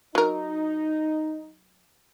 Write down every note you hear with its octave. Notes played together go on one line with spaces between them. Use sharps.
F#3 D#4 A#4